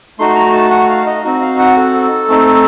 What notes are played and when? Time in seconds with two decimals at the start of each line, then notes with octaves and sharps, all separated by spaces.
0.19 A3 D#4 F#4 C6
0.35 A#5
0.53 A5
0.71 F#5
0.89 F5
1.06 D#5
1.24 C4 D#4 F#4
1.41 F5
1.59 F#5
1.77 A4
2.28 A3 C4 D#4